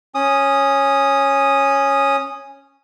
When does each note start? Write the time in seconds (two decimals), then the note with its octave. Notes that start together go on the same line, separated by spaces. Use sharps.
0.15 C#4 D#6